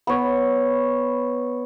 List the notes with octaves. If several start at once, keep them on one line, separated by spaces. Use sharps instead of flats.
B3 C#5